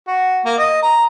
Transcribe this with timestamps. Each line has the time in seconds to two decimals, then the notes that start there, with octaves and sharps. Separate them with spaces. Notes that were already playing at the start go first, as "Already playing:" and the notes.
0.07 F#4
0.45 A#3
0.58 D#5
0.83 A#5